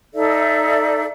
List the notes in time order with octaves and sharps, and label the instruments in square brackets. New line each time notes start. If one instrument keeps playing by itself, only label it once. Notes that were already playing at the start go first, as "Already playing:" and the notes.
[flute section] D#4 A4 D5 E5